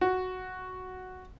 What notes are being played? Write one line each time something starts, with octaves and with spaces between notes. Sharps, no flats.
F#4